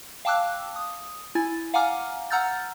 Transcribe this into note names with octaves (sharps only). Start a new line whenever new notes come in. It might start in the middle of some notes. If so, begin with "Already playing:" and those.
F5 G5 A5 D6 E6 F#6
D#6
E4 G#5 A6
F5 F#5 G#5 A#5 D6 F6
F#5 A#5 E6 F6 G6 A6